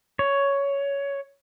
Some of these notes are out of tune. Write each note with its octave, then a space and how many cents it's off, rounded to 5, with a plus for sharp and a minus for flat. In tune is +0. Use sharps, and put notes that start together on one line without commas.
C#5 +10